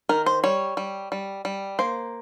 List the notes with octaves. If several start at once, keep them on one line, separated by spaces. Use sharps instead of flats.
D#3 A#4
C5
G3 C#5
G3
G3
G3
A#3 C5